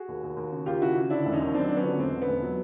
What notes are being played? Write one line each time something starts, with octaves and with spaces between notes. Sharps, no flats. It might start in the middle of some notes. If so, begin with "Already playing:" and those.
Already playing: F#4 G#4
D#2
D#2
D#2
C#3
D#2 F4 G4
C#3 E4 F#4
C#3
D3 D4 E4
E1
C#4 D#4
D#2
F#3 C4 D4
F#3 D4
B3 C#4
D3
E1 C4
D3
B3
E1
F#3